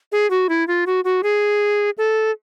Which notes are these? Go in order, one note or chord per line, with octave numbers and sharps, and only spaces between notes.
G#4
F#4
E4
F4
F#4
F#4
G#4
A4